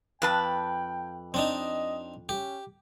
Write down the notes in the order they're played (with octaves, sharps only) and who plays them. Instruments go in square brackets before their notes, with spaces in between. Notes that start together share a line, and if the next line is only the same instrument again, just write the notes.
[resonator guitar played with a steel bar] F2 B4 A5 [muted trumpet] G5
[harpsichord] C4 D4 D#4 [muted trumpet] D#5
[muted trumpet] C#4 [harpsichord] G4